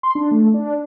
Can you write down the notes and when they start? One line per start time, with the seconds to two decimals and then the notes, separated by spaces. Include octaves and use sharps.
0.03 C6
0.15 D4
0.31 A3
0.54 D4